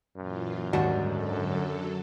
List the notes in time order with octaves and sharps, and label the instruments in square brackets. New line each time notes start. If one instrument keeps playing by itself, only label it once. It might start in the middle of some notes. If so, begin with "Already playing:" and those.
[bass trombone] F#2 [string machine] A#2 E3 F4
[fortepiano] D#2 [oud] G#2 D4 F#4 [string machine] D3 G3
[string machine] D3 F#3 A4